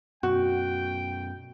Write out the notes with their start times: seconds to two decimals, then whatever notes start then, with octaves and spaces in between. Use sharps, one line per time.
0.23 F#2 B2 F#4 G5